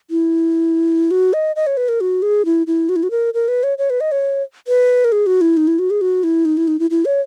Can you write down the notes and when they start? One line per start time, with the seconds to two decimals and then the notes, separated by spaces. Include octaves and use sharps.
0.11 E4
1.11 F#4
1.33 D#5
1.56 D#5
1.67 C#5
1.77 B4
1.89 A#4
2.01 F#4
2.22 G#4
2.45 E4
2.67 E4
2.89 F#4
2.96 E4
3.03 F#4
3.11 A#4
3.34 A#4
3.48 B4
3.63 C#5
3.78 C#5
3.90 B4
4.01 D#5
4.12 C#5
4.68 B4
5.05 A#4
5.12 G#4
5.26 F#4
5.41 E4
5.57 D#4
5.68 E4
5.79 F#4
5.90 G#4
6.01 F#4
6.24 E4
6.45 D#4
6.57 E4
6.68 D#4
6.79 E4
6.90 E4
7.05 C#5